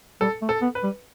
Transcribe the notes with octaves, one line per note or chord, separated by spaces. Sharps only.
G3 A4
A3
A4
B3
B4
G3